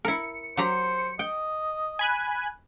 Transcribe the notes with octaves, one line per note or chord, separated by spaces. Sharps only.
E4 A#4 C#7
F#3 G4 C5 A#5
D#5 G5
G#5 B5 F#6